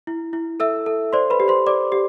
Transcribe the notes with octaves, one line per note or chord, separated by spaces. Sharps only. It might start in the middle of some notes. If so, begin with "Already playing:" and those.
E4
E4
A4 E5 E6
A4
C5 D5 C6
B4 B5
G4
C5 C6
D5 D6
G4